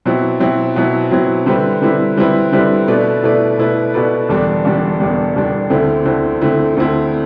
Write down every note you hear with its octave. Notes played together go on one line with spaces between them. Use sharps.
B2 F#3 C4 E4
B2 F#3 C4 E4
B2 F#3 C4 E4
B2 F#3 C4 E4
D3 G3 C4 E4 B4
D3 G3 C4 E4 B4
D3 G3 C4 E4 B4
D3 G3 C4 E4 B4
B2 A3 E4 B4 D5
B2 A3 E4 B4 D5
B2 A3 E4 B4 D5
B2 A3 E4 B4 D5
E1 E2 D3 G3 D4
E1 E2 D3 G3 D4
E1 E2 D3 G3 D4
E1 E2 D3 G3 D4
D2 D3 A3 C4 E4
D2 D3 A3 C4 E4
D2 D3 A3 C4 E4
D2 D3 A3 C4 E4